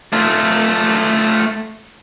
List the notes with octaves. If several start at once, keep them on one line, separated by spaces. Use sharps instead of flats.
A3 F4